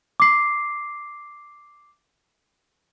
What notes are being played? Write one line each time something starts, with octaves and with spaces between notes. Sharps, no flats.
D6 C7